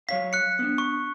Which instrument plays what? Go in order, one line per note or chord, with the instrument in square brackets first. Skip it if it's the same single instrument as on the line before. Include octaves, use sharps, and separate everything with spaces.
[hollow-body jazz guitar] F#3 C#5 F5 [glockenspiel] B6
[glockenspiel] F#6 C#7
[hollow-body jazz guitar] B3 D4
[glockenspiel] C#6